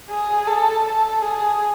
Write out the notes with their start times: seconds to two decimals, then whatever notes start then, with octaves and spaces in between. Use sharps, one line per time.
0.10 G#4
0.47 A4
0.84 A4
1.22 G#4